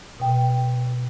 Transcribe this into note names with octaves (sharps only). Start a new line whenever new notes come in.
B2 G5